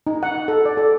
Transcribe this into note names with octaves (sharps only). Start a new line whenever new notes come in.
D#4
F#5
A4
D5
A4